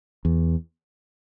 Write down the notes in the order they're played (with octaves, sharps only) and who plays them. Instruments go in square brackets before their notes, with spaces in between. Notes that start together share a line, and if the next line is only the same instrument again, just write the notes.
[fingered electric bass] E2